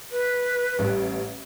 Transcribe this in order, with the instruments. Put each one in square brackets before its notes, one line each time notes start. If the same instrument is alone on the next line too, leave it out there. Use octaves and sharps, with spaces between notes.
[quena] B4
[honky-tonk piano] A1 G3